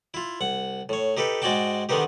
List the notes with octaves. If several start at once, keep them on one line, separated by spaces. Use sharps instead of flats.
E4 F4
C2 F#5
A2 C#5
D#4 G4 A4 B4
G#2 G#3 F#4 D5 G5 A5
D3 D#3 B3 D#4 G4